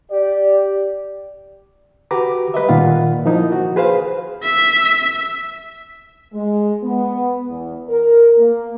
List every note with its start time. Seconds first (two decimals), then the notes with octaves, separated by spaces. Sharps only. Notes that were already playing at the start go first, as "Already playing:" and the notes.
0.11 G4 D5
2.11 F#4 G4 B4 A#5 D6
2.54 G3 B4 D#5 E5
2.68 A#2 D#3 F4 F5 F#5
3.26 F3 A#3 D#4 E4
3.52 F#4
3.76 G#4 B4 C5 F5
4.43 E5
6.33 G#3
6.83 B3
7.49 E2
7.90 A#4
8.39 A#3